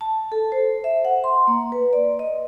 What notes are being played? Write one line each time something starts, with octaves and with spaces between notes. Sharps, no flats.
A5
A4
C5
E5
F#5
C6
A#3
B4
D5
D#5